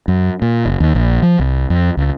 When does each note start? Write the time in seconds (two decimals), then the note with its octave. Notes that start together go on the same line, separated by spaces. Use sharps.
0.08 F#2
0.42 A#2
0.66 F#1
0.80 D#2
0.95 A#1
1.22 F3
1.39 C2
1.70 F2
1.97 C#2